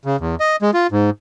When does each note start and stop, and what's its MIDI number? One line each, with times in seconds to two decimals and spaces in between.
0.05 0.17 49
0.20 0.35 40
0.40 0.56 75
0.62 0.71 56
0.74 0.87 65
0.91 1.10 44